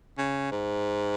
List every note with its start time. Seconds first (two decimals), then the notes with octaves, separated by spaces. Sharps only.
0.18 C#3
0.51 G#2